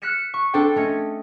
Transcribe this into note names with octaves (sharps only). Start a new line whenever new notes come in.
F6 F#6 B6 C#7 E7
C#6
C4 D4 A4 C5 G5
A3 C#4 D#5